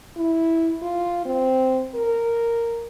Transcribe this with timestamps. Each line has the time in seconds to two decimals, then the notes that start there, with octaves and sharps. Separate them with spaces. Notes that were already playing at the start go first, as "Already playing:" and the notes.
0.17 E4
0.82 F4
1.25 C4
1.95 A#4